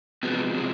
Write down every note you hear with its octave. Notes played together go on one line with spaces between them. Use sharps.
C3 F3 G#3 B3
C3 F3 G#3